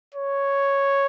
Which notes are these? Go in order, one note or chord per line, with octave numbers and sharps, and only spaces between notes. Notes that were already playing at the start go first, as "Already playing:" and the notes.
C#5